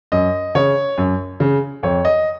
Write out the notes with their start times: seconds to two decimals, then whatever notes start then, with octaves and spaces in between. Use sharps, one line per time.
0.12 F#2 D#5
0.55 C#3 C#5
0.98 F#2
1.40 C#3
1.83 F2 C#5
2.05 D#5